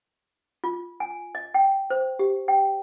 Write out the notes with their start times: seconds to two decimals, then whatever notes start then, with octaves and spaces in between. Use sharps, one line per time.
0.64 F4
1.00 G#5
1.35 D#5
1.54 G5
1.90 C5
2.19 G4
2.48 G5